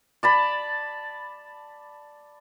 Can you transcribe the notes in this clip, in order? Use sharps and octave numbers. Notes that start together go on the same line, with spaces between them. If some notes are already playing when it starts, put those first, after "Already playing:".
D5 A5 B5